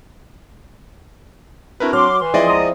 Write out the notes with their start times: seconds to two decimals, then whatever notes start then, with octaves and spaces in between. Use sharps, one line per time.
1.80 C4 D4 E4 F#4 A#4 B4
1.93 F#3 C6 D6 F6
2.19 E3 C6
2.34 F3 C4 E4 G#4 D5 D#5
2.48 C#2 A#5 D#6